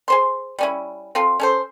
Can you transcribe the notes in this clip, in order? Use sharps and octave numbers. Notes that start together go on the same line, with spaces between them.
G#4 C5 C6
G3 C#4 E4
C4 F4 A4
C#4 A4 C5